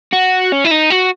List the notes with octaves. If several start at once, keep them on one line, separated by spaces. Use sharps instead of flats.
F#4
C#4
E4
D#4
F#4